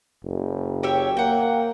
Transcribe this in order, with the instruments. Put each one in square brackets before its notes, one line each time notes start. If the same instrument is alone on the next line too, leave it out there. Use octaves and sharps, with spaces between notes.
[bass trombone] F#1
[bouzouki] G4 C#5 E5
[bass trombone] A#3 [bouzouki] F#5 G5